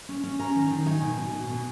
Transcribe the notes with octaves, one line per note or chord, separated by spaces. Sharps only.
C#4
C#4
C#4 A#5
D#3
D#3
D#4 G#5
B2
B2
B2
B2